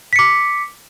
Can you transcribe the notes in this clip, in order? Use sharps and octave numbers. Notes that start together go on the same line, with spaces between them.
D6 B6 C#7